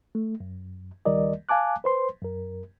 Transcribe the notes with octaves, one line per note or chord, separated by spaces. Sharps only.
A3
F#2
C#2 D#3 G3 A#4 D5 D#5
F5 G#5 A5 D6 F#6
B4 C5 C6
F#2 A#4